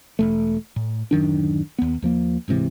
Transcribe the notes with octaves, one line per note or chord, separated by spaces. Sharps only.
E1 A3
A2
D1 F#2 D#3 D4
D#2 B3
D#2 F3 A#3
D1 G#2 C3 E3